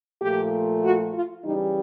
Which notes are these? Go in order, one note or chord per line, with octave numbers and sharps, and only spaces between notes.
A#2 F3 A3 G4
F#4
F4
C#3 E3 G3 D#4